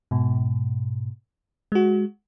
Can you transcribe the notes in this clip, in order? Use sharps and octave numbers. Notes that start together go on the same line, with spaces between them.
G#2 B2
G#3 F#4